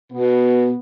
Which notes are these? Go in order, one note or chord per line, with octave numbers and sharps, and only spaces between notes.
B2 B3